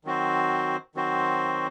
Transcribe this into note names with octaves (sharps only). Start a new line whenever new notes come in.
D#3 F#3 C4 F#4 C5
D#3 F#3 C4 F#4 C5